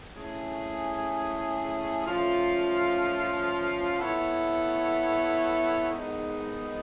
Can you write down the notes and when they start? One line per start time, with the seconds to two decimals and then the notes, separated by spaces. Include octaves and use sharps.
0.13 A3 C#4 E4 G#4
2.06 F3 A3 C#4 F4
3.98 B3 E4 A4 C#5
5.91 G#2 D#3 G#3 B3 D#4